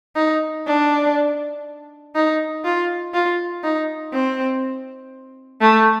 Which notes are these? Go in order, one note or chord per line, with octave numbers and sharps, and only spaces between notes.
D#4
D4
D#4
F4
F4
D#4
C4
A3